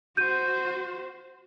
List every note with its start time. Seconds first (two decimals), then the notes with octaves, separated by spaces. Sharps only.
0.17 F#4 C5 G6 D#7